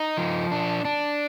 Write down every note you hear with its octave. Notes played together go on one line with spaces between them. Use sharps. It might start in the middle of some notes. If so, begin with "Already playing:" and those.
Already playing: D#4
F3
D4
D4